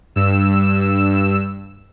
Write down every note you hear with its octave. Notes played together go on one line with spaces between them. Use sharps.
G2 E6 E7